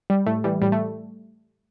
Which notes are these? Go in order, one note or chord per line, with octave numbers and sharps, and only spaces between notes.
G3
A2 A3
E3 G3
A2 G3
A3